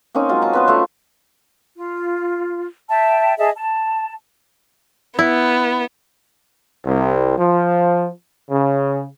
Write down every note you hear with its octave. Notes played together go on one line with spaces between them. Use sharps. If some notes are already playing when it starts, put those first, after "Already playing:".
A#3 C4 C#4 D#4
F#3 G#3 F4
D#4 A5
B3 B4 C5
F3 A3 F4 E5
F4
E5 G5 A5
G#4 D#5 E5 A5
A5
B3 E4
C2
F3
C#3